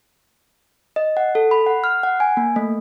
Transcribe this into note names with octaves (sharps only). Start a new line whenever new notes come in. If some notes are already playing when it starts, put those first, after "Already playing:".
D#5
F#5
A4
B5
F#5
F6
F#5
G#5
A#3
A3